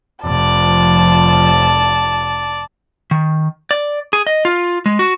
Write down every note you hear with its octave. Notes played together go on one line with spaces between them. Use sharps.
F1 F3 D5 A5
D#3
D5
G#4
D#5
F4
G#3
F#4